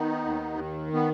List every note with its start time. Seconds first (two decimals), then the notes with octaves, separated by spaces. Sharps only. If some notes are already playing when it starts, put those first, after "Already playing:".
Already playing: D#3 B3 D#4
0.24 D#2
0.59 D#3
0.94 B3